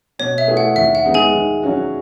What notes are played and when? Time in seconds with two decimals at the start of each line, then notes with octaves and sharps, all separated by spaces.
0.19 B2 C#5
0.38 E5
0.48 A3 E4 G#4 B4
0.57 F#5
0.76 D#2 E5
0.95 F#5
1.05 D#3 G#3 B3 D#4
1.14 G#4 G#5
1.33 D#3
1.62 F#3 C#4 F#4